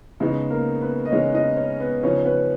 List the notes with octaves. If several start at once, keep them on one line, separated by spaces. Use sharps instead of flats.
C#3 G#3 B3 D#4
A#3 A#4
B3 B4
D#5
C#3 G#3 B3 C#4 D#4 C#5
D#4 D#5
C#4 C#5
B3 B4
C#3 F3 B3 C#4 D#4 C#5
B3 B4